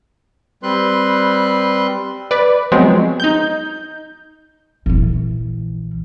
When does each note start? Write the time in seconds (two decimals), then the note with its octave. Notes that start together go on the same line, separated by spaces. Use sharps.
0.63 G3 C4 B4 C6 F#6
2.31 B4 D5
2.72 F3 F#3 G#3 B3 C4
3.20 D#4 G6
4.86 A#1 E3